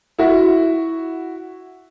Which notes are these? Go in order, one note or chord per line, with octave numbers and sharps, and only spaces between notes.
E4 F#4